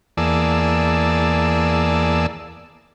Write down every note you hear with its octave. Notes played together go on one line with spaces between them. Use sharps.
E2 A#3 G#4 D5 A5 E6